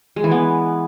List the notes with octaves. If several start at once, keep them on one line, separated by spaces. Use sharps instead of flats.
G#3
E3
B3